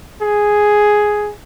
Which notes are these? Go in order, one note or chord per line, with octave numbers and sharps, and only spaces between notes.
G#4